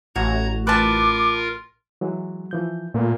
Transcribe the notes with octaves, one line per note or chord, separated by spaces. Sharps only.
A1 F#4 A#5 G#6
F4 A#4 B4 A5 D6
E3 F#3 G#3
E3 F3 G6
A#2 A3 B3